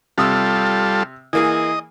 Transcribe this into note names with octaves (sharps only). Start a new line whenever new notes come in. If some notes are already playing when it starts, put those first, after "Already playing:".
C3 G3 F4 A4 D#6 E6
E3 A#3 G#4 D#5